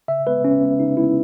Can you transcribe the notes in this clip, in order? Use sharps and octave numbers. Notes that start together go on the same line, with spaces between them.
C#3 E5
G#3 B3 B4
C#3 C#4
G#3 B3 C#4
C#3 D#4
G#3 B3 E4